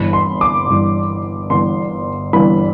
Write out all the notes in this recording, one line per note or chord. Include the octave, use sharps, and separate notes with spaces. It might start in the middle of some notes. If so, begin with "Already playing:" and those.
Already playing: G1 G2 E3 B5
C6
D6
G1 G2 E3
G1 G2 E3 C6
G1 G2 E3 B5